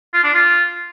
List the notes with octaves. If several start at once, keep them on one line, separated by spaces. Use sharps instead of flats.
F4
D4
F4